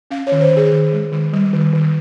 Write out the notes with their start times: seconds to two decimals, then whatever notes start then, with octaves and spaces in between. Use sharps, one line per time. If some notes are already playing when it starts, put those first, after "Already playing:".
0.11 C#4 F5
0.27 C#5
0.32 D#3
0.41 C5
0.51 D#3
0.57 G#4
0.72 D#3
0.93 G#3
1.12 D#3
1.33 G3
1.53 D#3
1.73 D#3